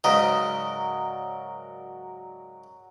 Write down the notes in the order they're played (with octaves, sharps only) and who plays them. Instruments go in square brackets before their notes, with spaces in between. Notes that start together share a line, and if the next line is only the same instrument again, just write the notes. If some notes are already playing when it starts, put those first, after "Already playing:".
[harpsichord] G#2 C#3 D#5 [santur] F#3 A#4 D5